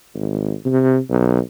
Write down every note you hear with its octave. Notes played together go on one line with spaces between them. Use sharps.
G#1
C3
B1